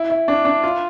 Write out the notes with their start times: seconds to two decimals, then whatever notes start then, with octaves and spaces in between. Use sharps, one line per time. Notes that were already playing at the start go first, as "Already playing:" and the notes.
Already playing: E4
0.10 E4
0.28 D4
0.45 D4
0.63 F4